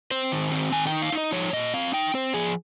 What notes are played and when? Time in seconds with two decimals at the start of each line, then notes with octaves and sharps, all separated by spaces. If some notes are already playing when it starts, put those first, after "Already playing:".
0.11 C4 C5
0.32 D#3
0.52 C4
0.72 D#3 G#5
0.87 G5
0.92 D#4
1.02 F5
1.12 D#4
1.17 D#5
1.32 F3 C#5
1.53 A#2 D#5
1.74 C4 F5
1.94 D#4 G5
2.14 C4 C5
2.34 F3 G#4